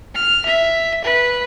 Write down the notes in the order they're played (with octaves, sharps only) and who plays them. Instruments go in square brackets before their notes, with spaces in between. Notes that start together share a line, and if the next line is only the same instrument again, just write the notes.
[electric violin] F6
E5
B4